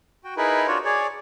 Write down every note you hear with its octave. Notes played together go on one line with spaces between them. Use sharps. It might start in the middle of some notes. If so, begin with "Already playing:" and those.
F#4 G5
D#4 E4 G#4 A#4 B4
D4 F4 F#4 C#5
G#4 C#5 D5